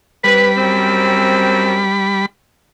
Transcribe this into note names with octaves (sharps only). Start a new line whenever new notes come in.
G3 C4 B4 B5
F#2 C4